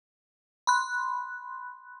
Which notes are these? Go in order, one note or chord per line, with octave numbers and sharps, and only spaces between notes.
B5 C6 F#6